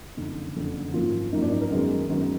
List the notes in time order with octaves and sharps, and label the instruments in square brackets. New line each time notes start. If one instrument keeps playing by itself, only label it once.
[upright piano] F#1 F2 D3 D#4
F#1 F2 D3
G#1 F#2 F3 A#3 F4
G#1 F#2 F3 A#3 D#4
D4
D#4
A#4
F#2 D#3 G#3 B3
F#2 D#3 G#3 B3